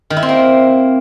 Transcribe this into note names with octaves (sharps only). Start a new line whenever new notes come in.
D#3
E4
C4
A#3